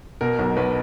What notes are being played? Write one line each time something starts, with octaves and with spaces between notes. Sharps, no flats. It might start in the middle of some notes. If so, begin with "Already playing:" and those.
B2 A#4
B1
B1 B4